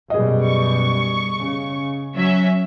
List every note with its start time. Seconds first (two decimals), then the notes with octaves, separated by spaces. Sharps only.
0.10 F#2 B2 G3 G#4 D#5
0.46 C#6
1.38 C#3
2.17 F#3 C#4 E5